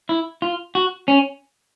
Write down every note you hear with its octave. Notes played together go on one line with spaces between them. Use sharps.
E4
F4
F#4
C#4